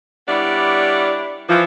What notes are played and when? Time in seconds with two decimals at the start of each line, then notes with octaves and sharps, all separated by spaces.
0.29 G3 B3 D4 E4 C#5 D5
1.49 E3 F3